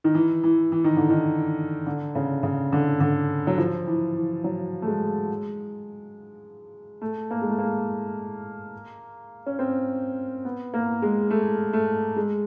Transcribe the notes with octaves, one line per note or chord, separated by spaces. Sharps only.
D#3
E3
E3
E3
D#3
D3
D#3
D3
C#3
C#3
D3
D3
F#3
F3
E3
E3
F#3
A3
G#3
A3
A#3
G#3
A3
A#3
C#4
C4
B3
A#3
G#3
A3
A3
G#3